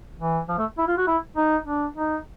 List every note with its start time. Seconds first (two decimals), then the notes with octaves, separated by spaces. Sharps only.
0.19 E3
0.49 F3
0.58 A3
0.78 E4
0.87 F4
0.98 F#4
1.07 E4
1.36 D#4
1.66 D4
1.96 D#4